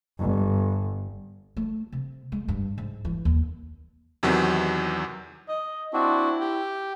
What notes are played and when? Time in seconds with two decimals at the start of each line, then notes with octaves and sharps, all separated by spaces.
0.19 G1
1.57 A3
1.92 C3
2.32 G#3
2.48 G2
2.78 G#2
3.05 E3
3.25 D#2
4.23 E2 C3 D#3 F#3
5.48 D#5
5.93 C4 D4 E4 F#4
6.41 G4 G5